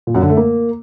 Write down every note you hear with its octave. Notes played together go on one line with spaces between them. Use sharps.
A#2
F#2
D3
A3
A#3